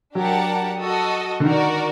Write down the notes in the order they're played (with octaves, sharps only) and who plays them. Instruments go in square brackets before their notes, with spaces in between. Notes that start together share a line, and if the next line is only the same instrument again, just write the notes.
[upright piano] F#3 [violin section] D4 G4 A#4 F#5 A5
[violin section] F#4 A4 D#5
[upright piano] D3
[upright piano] D#3 [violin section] F#4 A#4 D5